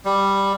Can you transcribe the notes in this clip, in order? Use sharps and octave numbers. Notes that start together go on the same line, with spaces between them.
G3